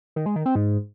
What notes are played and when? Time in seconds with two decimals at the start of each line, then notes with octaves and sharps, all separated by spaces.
0.16 D#3
0.26 G#3
0.36 D#3
0.46 C4
0.55 G#2